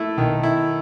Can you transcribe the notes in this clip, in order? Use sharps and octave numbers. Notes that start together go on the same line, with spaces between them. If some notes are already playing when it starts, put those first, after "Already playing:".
Already playing: A3 E4 A4
B1 B2 D#3
E4